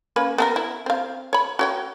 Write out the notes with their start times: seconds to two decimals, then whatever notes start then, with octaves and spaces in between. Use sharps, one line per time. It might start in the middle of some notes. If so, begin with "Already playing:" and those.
0.16 A#3 C#4 B4
0.38 B3 A4 A#4
0.56 E4
0.86 C4 F5
1.33 C#5 B5
1.59 F#4 C#5 G5